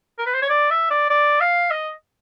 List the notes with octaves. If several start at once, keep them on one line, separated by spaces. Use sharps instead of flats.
A#4
B4
C5
C#5
D5
E5
D5
D5
F5
D#5